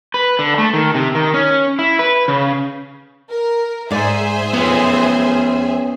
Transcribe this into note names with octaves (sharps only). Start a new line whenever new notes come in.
B4
D3
A3
D#3
C3
D#3
C#4
E4
B4
C#3
A#4
G#2 G#4 C5 D5 E5
F2 B3 C#4